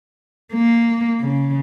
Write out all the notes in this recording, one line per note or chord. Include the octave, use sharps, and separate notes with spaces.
A#3
C#3